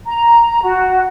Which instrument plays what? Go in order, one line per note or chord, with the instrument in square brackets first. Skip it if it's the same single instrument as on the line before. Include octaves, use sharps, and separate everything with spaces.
[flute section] A#5
F#4